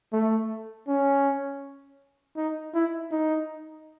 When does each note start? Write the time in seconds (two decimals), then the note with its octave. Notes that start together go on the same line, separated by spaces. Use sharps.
0.13 A3
0.88 C#4
2.37 D#4
2.74 E4
3.11 D#4